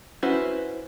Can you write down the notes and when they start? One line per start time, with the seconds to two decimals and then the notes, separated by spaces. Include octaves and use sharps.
0.23 C#4 E4 F#4 B4 C5